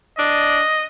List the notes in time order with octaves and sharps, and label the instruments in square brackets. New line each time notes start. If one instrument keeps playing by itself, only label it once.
[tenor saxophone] D4 [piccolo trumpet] D#5